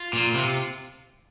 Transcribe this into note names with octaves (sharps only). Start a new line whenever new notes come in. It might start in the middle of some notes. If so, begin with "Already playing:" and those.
Already playing: F4
A#2
C3